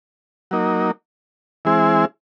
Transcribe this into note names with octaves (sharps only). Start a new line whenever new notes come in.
F#3 A#3 D#4
E3 G#3 C4 E4 G#4